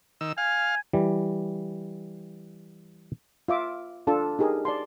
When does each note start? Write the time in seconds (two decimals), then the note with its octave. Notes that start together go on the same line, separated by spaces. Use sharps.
0.21 D#3 E6
0.38 F5 G#5
0.93 E3 G3
3.48 F4 E5 D6
4.07 D4 F4 A4 A5
4.39 D#4 G4 G#4 A#4
4.65 D5 A5 C6